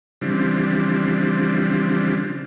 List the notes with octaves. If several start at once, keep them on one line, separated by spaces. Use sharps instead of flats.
C#3 E3 F3 G3 C4 D4